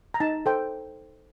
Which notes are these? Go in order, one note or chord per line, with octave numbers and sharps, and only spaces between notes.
A#5
D#4 A5
A4 C5 G5